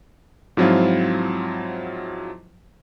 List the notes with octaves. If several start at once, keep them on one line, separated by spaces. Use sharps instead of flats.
G#2 F3 F#3 C4 E4 F4